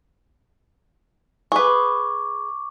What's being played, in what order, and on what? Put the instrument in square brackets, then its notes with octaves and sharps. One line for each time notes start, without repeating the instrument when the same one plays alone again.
[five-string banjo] G#4 B4 [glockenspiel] C#6 D6